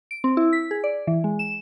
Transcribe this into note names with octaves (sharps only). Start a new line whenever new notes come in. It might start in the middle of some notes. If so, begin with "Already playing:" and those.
D7
C4
E4
B6
G#4
D5
E3
G#3
E7